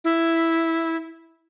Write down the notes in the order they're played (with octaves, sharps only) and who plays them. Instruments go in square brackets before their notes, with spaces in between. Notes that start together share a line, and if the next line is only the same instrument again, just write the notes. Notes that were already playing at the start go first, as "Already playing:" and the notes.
[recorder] E4